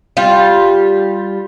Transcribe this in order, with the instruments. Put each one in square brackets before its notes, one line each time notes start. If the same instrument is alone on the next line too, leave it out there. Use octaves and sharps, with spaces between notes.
[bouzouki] G3 F4